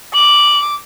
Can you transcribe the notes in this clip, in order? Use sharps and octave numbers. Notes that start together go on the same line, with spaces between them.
D6 F#7